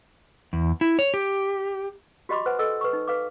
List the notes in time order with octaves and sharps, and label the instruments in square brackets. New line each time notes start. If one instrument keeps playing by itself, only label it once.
[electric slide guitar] E2
E4
C#5
G4
[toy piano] F#4 G4 D#5 B5 C6 D6
B4 C5 F#5 G#5
A4 D#5 G#5 E6
B4 C#6
D#4
B4 F5 D6